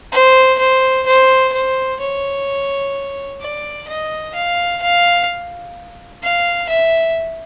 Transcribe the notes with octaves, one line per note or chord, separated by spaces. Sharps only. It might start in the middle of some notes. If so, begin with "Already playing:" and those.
C5
C5
C5
C5
C#5
D5
D#5
F5
F5
F5
E5